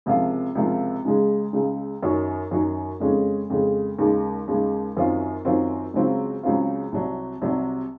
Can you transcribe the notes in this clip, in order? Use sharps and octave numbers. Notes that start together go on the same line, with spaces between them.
C#2 C3 F3 A#3 F4
C#2 C3 F3 A#3 F4
C#2 C#3 G#3
C#2 C#3 G#3
F#2 D#3 F#3 C#4 F#4
F#2 D#3 F#3 C#4 F#4
F2 C#3 G#3 C#4
F2 C#3 G#3 C#4
D#2 C#3 G#3
D#2 C#3 G#3
F#2 D#3 F#3 C4 F4
F#2 D#3 F#3 C4 F4
C#2 C#3 F#3 C4 F4
C#2 C#3 F#3 C4 F4
C2 C3 F#3
C2 C3 F#3